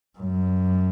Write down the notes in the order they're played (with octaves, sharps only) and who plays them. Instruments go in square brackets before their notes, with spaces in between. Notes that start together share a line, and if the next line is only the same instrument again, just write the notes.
[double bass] F#2